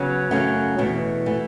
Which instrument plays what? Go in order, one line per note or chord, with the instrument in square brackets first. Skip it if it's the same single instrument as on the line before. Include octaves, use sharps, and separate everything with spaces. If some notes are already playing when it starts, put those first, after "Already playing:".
Already playing: [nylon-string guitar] C#3 F#3 B3
F#2 C#3 F#3 A3
E2 B2 A3
E3 A3